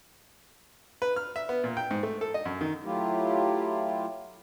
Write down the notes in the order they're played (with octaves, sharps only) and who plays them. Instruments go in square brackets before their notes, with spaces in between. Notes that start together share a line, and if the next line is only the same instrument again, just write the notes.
[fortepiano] B4
F6
E5
B3
A#2
G5
G#2
A3
A4
D#5
F#2
D#3
[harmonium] F#3 A3 E4 F4 G4